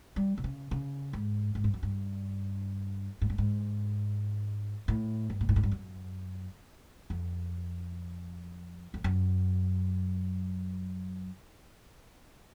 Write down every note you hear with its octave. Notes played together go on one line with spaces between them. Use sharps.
G3
C3
C#3
C#3
G#2
G#2
G2
F#2
G2
G#2
G2
G#2
A2
G2
A#2
A2
G#2
G2
F#2
F2
F2
F#2